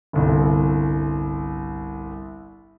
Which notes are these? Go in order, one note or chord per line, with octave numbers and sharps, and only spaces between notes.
G1 C2